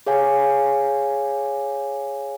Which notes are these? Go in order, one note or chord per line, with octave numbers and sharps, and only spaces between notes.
G#4 C#5 F5 G#5